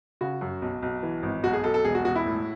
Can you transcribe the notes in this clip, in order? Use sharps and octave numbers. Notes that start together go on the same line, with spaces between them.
C#3 F#4
F#2
B1
B1
E3
G#1
B1 F#4
G#4
B1 A4
A4
E1 G#4
F#4
E1 F#4
E4
A2